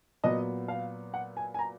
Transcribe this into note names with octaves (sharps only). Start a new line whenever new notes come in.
A#2 F#3 B3 D#5
F5
F#5
G#5
G#5
A#5